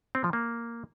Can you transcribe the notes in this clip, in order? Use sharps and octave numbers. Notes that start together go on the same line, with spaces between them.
C4
F3
A#3